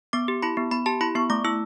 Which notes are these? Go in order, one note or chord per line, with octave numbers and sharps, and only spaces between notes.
B3 D6
G4
E4 B5
B3
B3 B5
G4 A5
E4 B5
B3 C#6
A3 D6
E4 E6